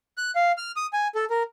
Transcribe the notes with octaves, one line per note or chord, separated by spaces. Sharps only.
F#6
F5
F6
D#6
G#5
A4
A#4